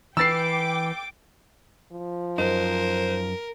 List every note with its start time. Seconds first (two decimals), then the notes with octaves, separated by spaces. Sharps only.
0.17 E3 B4 G5 D6 E6 A6 C7
1.92 F3
2.38 F#2 D#4 A#4 C5